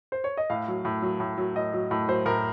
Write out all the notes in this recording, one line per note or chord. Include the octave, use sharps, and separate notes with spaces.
C5
C#5
D#5
A2 F5
F#3
A2
F#3
A2
F#3
A2 D#5
F#3
A2
F#3 C5
A2 A#4